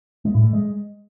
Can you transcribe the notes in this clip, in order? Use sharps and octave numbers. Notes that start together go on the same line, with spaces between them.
G#3
A2
A3
G#3